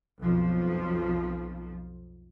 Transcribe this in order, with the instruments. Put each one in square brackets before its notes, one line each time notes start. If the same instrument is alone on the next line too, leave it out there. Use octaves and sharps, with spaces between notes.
[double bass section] B1 F2 F3